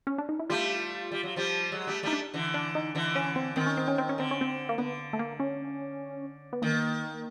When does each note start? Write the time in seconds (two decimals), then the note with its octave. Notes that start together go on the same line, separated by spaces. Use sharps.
0.07 C#4
0.18 D4
0.29 D#4
0.39 E4
0.50 G3 A3 F4
1.12 G3
1.23 F#3
1.36 F3 G3
1.72 F#3 G#3
1.87 G3 A3
2.03 G3 A3 D#4
2.13 D4
2.34 D3 E3
2.54 D4
2.75 D#4
2.95 D3 E3
3.15 C#4
3.36 C4
3.56 D#3 C4
3.66 C#4
3.77 C4
3.88 C#4
3.98 C4
4.09 C#4
4.18 D3 C4
4.31 C#4
4.41 C4
4.69 A#3
4.78 D3 B3
5.13 A3
5.19 A#3
5.40 C#4
6.53 B3
6.62 D#3 A#3